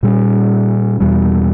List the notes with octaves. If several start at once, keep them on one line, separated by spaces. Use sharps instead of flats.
A#2 G3 C#4
E2 B2 G3